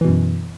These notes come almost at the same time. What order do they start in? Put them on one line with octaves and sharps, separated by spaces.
E3 B2 F#2